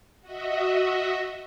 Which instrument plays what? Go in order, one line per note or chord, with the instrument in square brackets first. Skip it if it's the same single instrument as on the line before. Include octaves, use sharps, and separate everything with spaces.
[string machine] F#4 D#5 E5